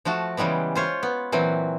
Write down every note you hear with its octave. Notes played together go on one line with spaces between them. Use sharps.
F3 A3 F#4 A5
C#3 E3 G3 G#3 B3
F4 C5 C#5
B3
A#2 E3 F#3 C4